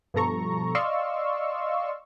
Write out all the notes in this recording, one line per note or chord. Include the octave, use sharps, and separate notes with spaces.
G2 B2 F3 A4 A#5 C#6
D5 D#5 F5 C6 C#6 E6